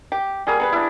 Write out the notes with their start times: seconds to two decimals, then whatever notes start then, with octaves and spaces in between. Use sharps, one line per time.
0.12 G4
0.47 F#3 G3 A#3 G#4
0.60 B3 A4 B4
0.72 D4 E4